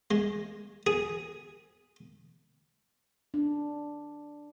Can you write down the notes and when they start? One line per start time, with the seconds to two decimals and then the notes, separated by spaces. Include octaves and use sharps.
0.11 G#3
0.87 G#4
3.34 D4